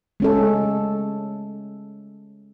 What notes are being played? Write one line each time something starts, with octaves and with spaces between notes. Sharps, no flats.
G#3 C#4 A4